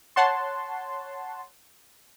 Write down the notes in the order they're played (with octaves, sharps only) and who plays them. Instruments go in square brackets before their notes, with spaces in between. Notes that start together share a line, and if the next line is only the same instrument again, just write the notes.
[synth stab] C#5 F#5 A5 C6